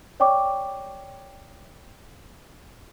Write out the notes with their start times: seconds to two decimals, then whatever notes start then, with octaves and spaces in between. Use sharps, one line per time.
0.20 C#5 D5 G5 C#6 D6